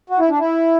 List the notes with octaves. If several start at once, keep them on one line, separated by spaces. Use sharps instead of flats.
F#4
E4
D4
E4